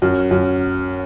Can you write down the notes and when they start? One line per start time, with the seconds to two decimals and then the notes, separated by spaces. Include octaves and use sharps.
0.02 F#2
0.31 F#2